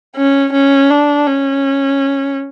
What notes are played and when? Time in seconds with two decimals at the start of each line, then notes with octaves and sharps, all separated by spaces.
0.16 C#4
0.53 C#4
0.90 D4
1.27 C#4